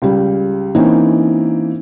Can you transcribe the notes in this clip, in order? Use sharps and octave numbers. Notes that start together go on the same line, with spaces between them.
C#2 G3
E3 A#3 C4 C#4 D#4